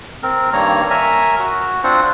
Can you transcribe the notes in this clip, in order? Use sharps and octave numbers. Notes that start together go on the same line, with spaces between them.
C4 A#4
G2 D#3 G3 A#3 C#5 A#5
A#4 C#5 E5 G#5 A#5
F#4
C4 D4 F4 C5 F#5